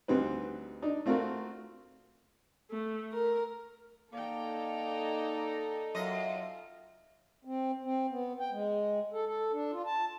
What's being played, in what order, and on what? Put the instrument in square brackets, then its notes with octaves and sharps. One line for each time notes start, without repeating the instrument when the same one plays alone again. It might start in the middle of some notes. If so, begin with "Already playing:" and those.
[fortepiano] D2 G3 C4 D#4 B4
D4 D#4
A3 C4 F4 F#4 A#4
[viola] A3
A#4
[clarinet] A#3 [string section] D#4 A4 [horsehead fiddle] D5 G5
[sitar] F#2 D#5 [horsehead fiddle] F4
[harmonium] C4
C4
B3
G5
G#3
A4
A4
D4
F4
A5